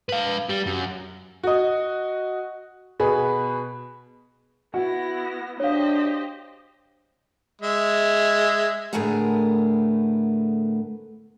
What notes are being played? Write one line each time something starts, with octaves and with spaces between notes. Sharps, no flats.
B4 F5
G3
F#2
F#4 D#5
B2 G#4 B4
B3 E4 F#4 A#6
D4 G4 C5 C#5 D#5 F5
G#3 E5
A2 D3 A3 B3 G#4 A#4